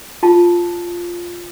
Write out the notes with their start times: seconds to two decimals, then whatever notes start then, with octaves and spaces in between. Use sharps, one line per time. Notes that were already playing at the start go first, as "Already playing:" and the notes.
0.23 F4 A5